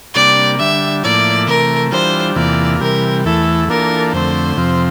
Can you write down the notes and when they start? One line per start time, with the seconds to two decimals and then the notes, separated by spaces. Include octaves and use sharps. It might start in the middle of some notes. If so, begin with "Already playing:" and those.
0.15 C3 G3 A#3 D4 D5
0.59 D3 G3 D4 E5
1.04 A2 F3 A#3 E4 D5
1.47 C3 E3 A3 A#4
1.92 E3 G3 D4 F4 C5
2.36 E2 C3 E3 A#3 F4 D5
2.80 C3 E3 G3 A#4
3.25 E2 E3 A3 E4 A4
3.68 E3 A#3 D4 F4 A4 A#4
4.13 F2 D3 A3 C4 C5
4.57 F2 C3 F3 C4